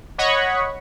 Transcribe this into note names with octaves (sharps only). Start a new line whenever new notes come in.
C#5 D#5 F#5 B5 C#6